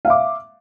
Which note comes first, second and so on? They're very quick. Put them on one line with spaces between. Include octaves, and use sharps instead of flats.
F5 E5 D6